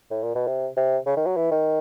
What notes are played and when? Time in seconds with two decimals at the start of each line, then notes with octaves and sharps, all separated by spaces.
0.11 A2
0.23 A#2
0.35 B2
0.47 C3
0.77 C3
1.06 C#3
1.17 D#3
1.26 F#3
1.36 E3
1.51 D#3